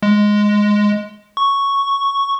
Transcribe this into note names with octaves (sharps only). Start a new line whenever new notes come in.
G#3
C#6